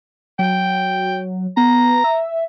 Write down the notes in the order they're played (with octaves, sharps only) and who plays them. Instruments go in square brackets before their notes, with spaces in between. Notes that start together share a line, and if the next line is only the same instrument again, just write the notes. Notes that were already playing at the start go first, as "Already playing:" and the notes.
[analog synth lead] F#3 [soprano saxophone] G5
[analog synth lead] B3 [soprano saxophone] A#5
[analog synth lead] E5